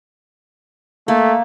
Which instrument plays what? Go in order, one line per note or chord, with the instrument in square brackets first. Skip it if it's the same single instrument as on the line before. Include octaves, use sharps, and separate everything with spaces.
[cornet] A3 [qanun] A#3